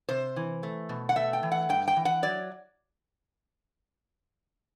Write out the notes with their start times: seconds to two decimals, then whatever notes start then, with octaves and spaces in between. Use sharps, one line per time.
0.09 C3 C5
0.36 E3
0.63 A3
0.89 B2
1.09 F#5
1.16 A3 E5
1.33 G5
1.43 E3
1.52 F#5
1.69 G2 G5
1.88 G5
1.96 E3
2.05 F#5
2.23 F#3 D5